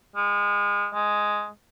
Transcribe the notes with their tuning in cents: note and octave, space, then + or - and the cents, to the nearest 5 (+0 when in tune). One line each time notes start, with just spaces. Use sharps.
G#3 -30
G#3 +5